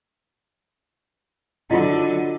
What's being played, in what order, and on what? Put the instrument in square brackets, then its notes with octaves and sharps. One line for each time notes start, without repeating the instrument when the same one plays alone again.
[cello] D3 F#3 [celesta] E4 F4 D#5